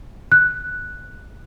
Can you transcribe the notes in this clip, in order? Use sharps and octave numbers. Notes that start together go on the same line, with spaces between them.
F#6